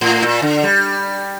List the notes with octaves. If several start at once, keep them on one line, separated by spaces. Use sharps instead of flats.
A2
A#2
D3
G3